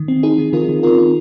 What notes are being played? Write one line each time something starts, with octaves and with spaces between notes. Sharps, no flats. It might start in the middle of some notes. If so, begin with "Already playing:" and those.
Already playing: D#3
C4
C4 D#4 G#4
D#3
D#3 F4 A#4
D#3
C4 F4 A#4
C4 F4